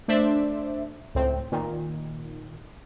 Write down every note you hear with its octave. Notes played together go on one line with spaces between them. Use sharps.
A3 D4 C5 D5 E5
C#2 A2 C4
A#2 D#3